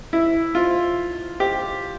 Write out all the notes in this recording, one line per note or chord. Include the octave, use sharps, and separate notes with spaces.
E4
F4
G4